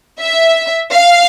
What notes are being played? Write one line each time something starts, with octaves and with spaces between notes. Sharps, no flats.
E5
F5